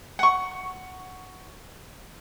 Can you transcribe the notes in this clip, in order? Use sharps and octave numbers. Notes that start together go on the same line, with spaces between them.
F#5 C#6